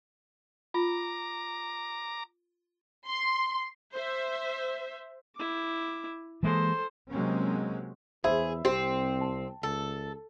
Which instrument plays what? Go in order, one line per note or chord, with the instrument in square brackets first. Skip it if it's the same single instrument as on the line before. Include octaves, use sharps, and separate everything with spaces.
[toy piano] F4 [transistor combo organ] A#5 D6
[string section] C6
[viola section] C5 E5
[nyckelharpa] E4 D6
[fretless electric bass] E3 G#3 A#3 [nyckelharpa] A4 C5
[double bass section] C3 F#3 G#3 A#3 C4 C#4
[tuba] E2 [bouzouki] G#4 [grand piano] C5 E5 B5
[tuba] C2 [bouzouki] C4 [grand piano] G4
[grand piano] A5
[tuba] C#2 [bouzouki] A4